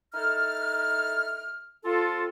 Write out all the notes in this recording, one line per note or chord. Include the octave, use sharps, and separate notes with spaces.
D#4 E4 A4 F6
C4 F4 A4